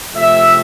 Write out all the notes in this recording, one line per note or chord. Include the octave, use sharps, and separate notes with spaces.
C3 F3 A3 C4 E5